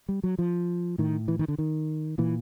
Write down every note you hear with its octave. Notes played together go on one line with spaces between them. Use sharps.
G3
F#3
F3
A2 D#3
E3
D#3
D3
D#3
A#2 E3